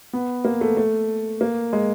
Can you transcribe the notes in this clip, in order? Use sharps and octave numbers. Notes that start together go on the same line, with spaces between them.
B3
A#3
A3
A3
A#3
G#3